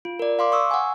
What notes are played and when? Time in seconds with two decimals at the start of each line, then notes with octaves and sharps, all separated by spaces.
0.05 F4
0.19 A#4 D5
0.39 F5 C6 D6
0.52 C#6 D#6 E6
0.71 F#5 G#5